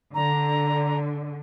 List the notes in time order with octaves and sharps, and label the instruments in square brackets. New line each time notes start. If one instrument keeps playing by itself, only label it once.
[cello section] D3 [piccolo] A#5